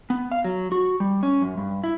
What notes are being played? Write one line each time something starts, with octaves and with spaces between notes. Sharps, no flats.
B3
F5
F#3
F#4
G3
C#4
F#2
G2
E4